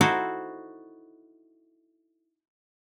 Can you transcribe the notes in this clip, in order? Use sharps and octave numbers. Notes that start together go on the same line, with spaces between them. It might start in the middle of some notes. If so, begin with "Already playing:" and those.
D#4 E4 F#4 A4 C5